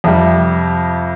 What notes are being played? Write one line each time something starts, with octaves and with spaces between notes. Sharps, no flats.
F2 C3 G3